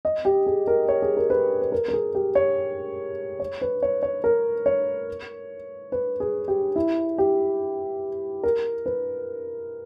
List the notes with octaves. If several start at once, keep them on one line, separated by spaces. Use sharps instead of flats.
D#5
G4
G#4
A#4
C#5
G#4
A#4
B4
B4
A#4
A#4
G#4
G4
C#5
C#5
B4
C#5
C#5
A#4
C#5
B4
G#4
G4
E4
G4
A#4
B4